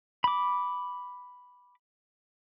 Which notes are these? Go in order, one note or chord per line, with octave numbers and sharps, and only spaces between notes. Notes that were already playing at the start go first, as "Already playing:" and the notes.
B5 D6